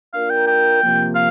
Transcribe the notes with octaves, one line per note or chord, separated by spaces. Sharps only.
A#3 D4 F4 A#4 F5
G5
G5
C3 F3 A#3
F5